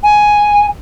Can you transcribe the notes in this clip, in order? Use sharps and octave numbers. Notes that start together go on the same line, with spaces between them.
G#5